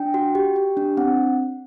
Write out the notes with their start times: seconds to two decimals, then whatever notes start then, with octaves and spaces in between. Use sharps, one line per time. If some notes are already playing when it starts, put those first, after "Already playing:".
Already playing: D4 G5
0.14 F#4
0.35 G4
0.56 G4
0.77 D4
0.97 C4 F#5